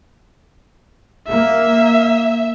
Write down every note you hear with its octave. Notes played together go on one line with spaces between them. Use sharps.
A#3 E5